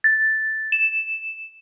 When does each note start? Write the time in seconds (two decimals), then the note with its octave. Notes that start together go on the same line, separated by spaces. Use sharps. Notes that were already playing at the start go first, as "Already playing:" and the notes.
0.04 A6
0.72 E7